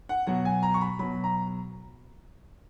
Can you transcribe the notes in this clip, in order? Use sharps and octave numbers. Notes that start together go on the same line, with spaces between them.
F#5
B2 F#3 F#5
G#5
A#5
C#6
B5
B2 F#3 B5
A#5